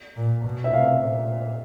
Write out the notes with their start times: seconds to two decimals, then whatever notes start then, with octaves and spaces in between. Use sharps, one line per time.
0.16 A#2
0.45 B2
0.64 E5
0.73 C3 F5
1.02 A#2